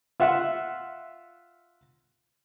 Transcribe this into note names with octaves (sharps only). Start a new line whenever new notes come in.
F4 E5 F#5